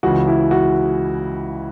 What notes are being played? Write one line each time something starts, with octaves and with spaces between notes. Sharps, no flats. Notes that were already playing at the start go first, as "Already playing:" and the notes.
C#2 C#3 E3 F#4
E4
F#4